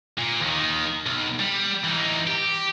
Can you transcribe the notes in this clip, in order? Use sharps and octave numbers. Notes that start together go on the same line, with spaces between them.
A#2
D#2 D#3
B1
G3
E3 D#4
G4